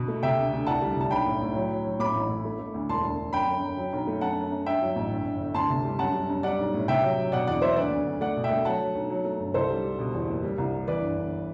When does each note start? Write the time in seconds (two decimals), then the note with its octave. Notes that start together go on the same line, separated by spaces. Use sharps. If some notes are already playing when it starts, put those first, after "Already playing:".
Already playing: B2
0.08 A3
0.23 C3 E5 G5
0.37 D2
0.52 D2
0.67 C2 F#5 A5
0.82 G3
0.96 C2 A5
1.11 B1 G5 B5
1.26 A2
1.41 A2
1.55 F#3
1.70 F#3
1.85 F#3
2.00 A2 B5 D6
2.15 A1
2.29 A2
2.45 A3
2.59 A3
2.74 D2
2.89 E1 A5 C6
3.04 E1
3.18 D3
3.33 F#2 G5 B5
3.47 F#2
3.63 F#2
3.77 F#3
3.93 B1
4.07 A3
4.21 F#2 F#5 A5
4.37 F#2
4.52 F#2
4.66 G2 E5 G5
4.82 F#3
4.96 A1
5.11 G1
5.25 G1
5.40 G1
5.55 D2 A5 C6
5.70 C3
5.84 G3
5.99 F#2 F#5 A5
6.14 G3
6.30 F#2
6.43 G3 D5 F#5
6.59 B1
6.74 A2
6.88 C3 E5 G5
7.03 F#3
7.18 F#3
7.32 B2 D5 F#5
7.47 E2 D5 F#5
7.62 F#3 C5 E5
7.76 D2 B4 D5
7.91 D2
8.07 D2
8.21 A3 D5 F#5
8.37 B2
8.44 E5 G5
8.50 A3
8.65 F#3 F#5 A5
8.81 F#3
8.95 B1
9.10 F#3
9.25 A3
9.40 G1
9.54 C2 A4 C5
9.70 G3
9.84 G3
9.99 B2
10.14 E2
10.29 F#1
10.43 G3
10.58 C2
10.72 G3
10.87 E3 B4 D5
11.02 G1
11.18 G1